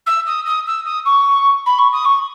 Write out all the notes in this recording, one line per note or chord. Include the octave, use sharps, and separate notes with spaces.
E6
D#6
D#6
E6
D#6
C#6
B5
C#6
D#6
C#6